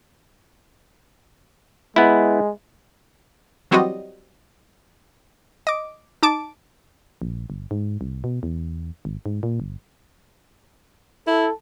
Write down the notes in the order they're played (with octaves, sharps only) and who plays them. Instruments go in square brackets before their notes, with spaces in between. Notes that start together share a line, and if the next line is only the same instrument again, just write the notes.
[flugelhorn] G#3 [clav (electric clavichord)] B3 E4
[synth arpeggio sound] E3 F#3 G3 C4 F#4 D#5
D#5 D6
D#4 A5 D6
[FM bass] A#1
G1
G#2
C2
B2
E2
G#1
G#2
A#2
G1
[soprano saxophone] E4 [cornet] A4